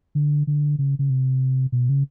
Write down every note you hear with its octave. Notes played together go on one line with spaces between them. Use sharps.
D3
D3
C#3
C#3
C3
B2
C#3